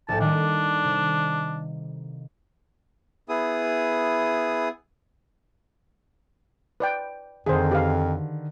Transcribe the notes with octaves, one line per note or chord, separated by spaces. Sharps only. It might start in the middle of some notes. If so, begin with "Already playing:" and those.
A#1 A2 A5
D#3 G3 D4
C3 E7
B3 E4 G#4 D#6
B4 D5 G5
F2 D3 D#3 G#4 C5
G4 B4 F5